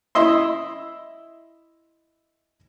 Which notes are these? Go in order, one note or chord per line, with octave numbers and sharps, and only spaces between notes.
E4 D#5 E5 C6